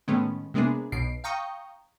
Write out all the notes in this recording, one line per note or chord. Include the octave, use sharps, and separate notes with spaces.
A2 D#3 G#3 A3 B3 C#4
C3 G#3 A#3 B3 D4 G#4
B1 B2 C7 D7
F5 G5 A#5 C#6 D#6